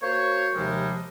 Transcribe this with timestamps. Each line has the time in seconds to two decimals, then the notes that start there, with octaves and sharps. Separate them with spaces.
0.01 A#3 F#4 C5 C#5
0.55 D#2 C3 F3 G3 G#3